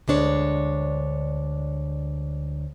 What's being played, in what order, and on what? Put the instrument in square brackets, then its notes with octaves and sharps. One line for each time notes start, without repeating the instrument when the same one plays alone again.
[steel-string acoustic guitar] D2 G#3 D4 C#5